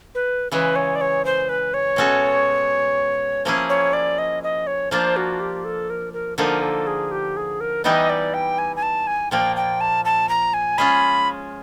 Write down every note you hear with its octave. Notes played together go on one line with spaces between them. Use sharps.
B4
C#3 E3 G#3 B4
C#5
D5
C#5
C5
B4
C#5
B2 G#3 C#4 F#4 A4
F3 A#3 C#4 E4 G#4
C#5
D5
D#5
D#5
C#5
F3 A#3 D4 F4 C5
F#4
G4
A4
A#4
A#4
D3 F3 A#3 D#4 A#4
A4
G#4
G4
G#4
A#4
E3 G3 B3 D#4 G4 D#5
D5
G5
G#5
G#5
A5
G#5
A#2 F3 A#3 G5
G5
A5
A5
A#5
G#5
G#3 C#4 F4 G#4 B5